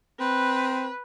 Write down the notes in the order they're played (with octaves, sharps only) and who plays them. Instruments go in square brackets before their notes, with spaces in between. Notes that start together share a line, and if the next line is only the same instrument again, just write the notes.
[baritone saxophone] C4 [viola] B4